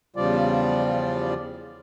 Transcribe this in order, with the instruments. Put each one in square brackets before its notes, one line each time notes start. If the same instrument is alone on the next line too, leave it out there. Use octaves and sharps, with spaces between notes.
[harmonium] E2 C#3 F3 G3 F4 D5